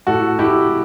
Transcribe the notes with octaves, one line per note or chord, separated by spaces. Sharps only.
A2 F#4 A4
A2 E4 G4